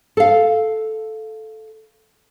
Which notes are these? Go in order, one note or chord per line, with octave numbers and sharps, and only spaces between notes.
A4 F5